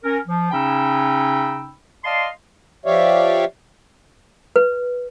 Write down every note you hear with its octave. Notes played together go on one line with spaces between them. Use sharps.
C#4 A#4
F3
C#3 C#4 D#4 G5 B5 E6
D5 D#5 F5 A5 C6
F3 G4 C#5 D5 E5 F5
B4